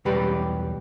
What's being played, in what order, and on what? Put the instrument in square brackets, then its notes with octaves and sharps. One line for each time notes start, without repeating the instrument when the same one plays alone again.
[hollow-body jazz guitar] B1 E2 G3 G4 B4